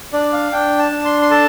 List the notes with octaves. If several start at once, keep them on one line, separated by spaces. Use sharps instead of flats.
D4 D5
F5
D4 G5
A5
D4
C6
C6
A4 A5